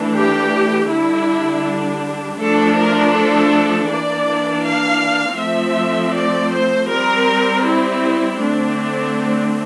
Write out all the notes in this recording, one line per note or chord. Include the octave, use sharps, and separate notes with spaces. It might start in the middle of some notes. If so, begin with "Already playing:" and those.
Already playing: E3 A3 D4
G4
D3 G3 D4 E4
F3 A3 D4 A4
A#4
A4
E3 A#3 D4 D5
F5
F3 A3 C4 E5
D5
C5
G3 C4 A#4
E4
D3 A3 C4 D4